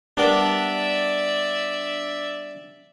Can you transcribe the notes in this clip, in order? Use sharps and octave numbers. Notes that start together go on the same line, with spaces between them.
G3 B3 D4 A#4 D5 E5